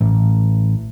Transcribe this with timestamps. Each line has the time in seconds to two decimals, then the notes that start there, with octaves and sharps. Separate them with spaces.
0.01 A1